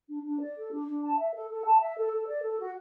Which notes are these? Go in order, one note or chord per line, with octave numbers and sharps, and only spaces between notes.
D4
D4
D5
A4
D4
D4
A5
E5
A4
A4
A5
E5
A4
A4
D5
A4
F#4